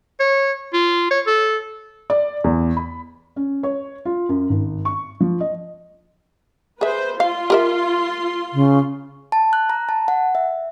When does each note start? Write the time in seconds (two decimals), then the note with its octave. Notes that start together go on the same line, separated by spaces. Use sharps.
0.20 C#5
0.73 F4
1.11 C#5
1.26 A4
2.10 D5
2.44 E2
2.77 B5
3.36 C#4
3.63 C#5
4.05 F4
4.29 F#2
4.49 G#1
4.85 C#6
5.20 F3
5.40 D#5
6.81 G#4 B4 C5 E5
7.20 F4 F5 C6
7.50 G4 A#4 E5
8.53 C#3
9.32 A5
9.53 F#6
9.70 A#5
9.89 A5
10.08 F#5
10.35 E5